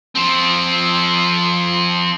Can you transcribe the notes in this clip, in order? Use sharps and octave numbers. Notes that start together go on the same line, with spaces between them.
F3 C4